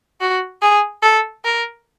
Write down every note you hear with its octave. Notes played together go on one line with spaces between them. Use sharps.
F#4
G#4
A4
A#4